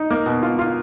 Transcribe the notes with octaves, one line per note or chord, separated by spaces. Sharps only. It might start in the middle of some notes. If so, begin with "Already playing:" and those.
Already playing: D#4
A#3
B2
F4
F4